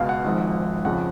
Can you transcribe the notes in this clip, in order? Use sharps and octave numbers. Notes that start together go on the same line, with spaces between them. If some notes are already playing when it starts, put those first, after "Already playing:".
Already playing: C#2 B2 F5
F#5
G#1 G#2 F3
F2 C#3 F3 F#5